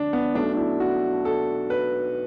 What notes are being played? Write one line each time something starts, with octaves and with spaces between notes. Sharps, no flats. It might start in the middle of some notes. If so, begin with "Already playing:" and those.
Already playing: D2 D4
B3
B1 B2 A3 D4
D4
E4
F#4
A4
B4